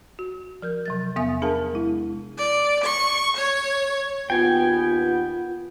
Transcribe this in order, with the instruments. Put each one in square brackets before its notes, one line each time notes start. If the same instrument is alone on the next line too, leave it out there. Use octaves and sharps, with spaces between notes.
[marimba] F#4
F3 A#4 G6
C3 F#3 A6
E2 C3 B3 E5 G#5 D#6
D4 G#4 A#4 F5 A5
G#3 E4
[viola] D5
C#6
C#5
[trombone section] D#2 B3 [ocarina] F4 [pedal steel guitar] G5 G#5